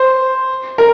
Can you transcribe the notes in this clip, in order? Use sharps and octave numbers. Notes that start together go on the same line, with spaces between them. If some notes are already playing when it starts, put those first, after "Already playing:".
Already playing: C5
A#4